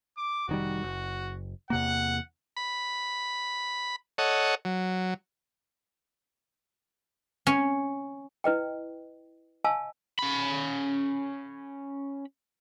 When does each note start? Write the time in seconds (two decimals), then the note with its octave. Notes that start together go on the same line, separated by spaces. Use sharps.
0.17 D6
0.49 F1 D#3 G3 F#4
0.83 F#1
1.70 E2 C3 A#3 F#5
2.57 B5
4.18 A4 C#5 D#5 F#5
4.65 F#3
7.47 C#4
8.44 E4 B4 D#5 G5
9.64 D#5 F5 G#5 A5 E6
10.19 C#4 B5